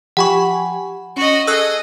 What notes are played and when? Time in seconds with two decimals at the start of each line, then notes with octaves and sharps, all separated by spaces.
0.17 F3 G4 F#5 G#5 B5 C#6
1.17 C#4 F#4 D#5
1.47 G#4 A4 D#5 E6 F#6